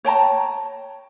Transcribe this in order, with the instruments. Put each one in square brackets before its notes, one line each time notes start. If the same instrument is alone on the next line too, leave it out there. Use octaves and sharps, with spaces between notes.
[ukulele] C#5 G5 A5 A#5